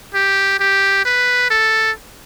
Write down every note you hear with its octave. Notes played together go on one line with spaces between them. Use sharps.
G4
G4
B4
A4